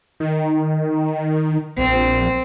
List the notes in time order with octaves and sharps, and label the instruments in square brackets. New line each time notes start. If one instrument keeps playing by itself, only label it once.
[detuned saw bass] D#3
[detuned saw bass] A#1 [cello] C4